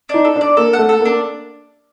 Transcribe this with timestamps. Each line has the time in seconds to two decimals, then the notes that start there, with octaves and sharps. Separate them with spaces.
0.09 D4 D#4
0.25 A4
0.36 D4
0.41 D5
0.57 A#3 A4
0.73 A3 F#5
0.89 A4
1.00 A#3 D4